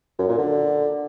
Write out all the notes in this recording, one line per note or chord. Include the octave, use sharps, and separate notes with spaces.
F#2
A#2
D3